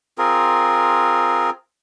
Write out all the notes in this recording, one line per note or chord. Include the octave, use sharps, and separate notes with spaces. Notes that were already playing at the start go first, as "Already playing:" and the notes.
C4 F4 G#4 A#4